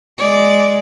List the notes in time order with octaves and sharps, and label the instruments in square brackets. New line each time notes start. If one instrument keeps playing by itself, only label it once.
[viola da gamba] G#3 D5